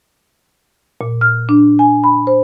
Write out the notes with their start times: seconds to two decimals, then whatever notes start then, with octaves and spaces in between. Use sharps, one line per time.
1.01 A#2
1.21 F6
1.49 D4
1.79 G#5
2.04 B5
2.27 C5